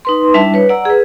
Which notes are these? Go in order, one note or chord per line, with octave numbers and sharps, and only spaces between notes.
D#4 B4 C6
G3 D4 E4 E5 A5
B4 C#5
D5 F#5 A#5 E6
G#4 B4